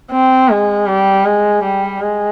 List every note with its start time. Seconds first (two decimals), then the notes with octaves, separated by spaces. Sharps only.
0.11 C4
0.49 G#3
0.87 G3
1.25 G#3
1.64 G3
2.01 G#3